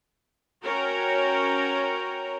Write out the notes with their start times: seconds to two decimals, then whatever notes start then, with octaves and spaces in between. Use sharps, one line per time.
0.62 C#4 F#4 A#4 C#5 G5 A#5